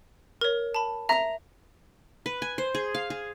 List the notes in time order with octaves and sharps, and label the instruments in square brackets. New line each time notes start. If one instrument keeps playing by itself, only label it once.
[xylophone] A#4 C#5
A5 B5
[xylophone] E5 F7 [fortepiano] A#5
[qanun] B4
G#5
C5
G#4
F5
G#4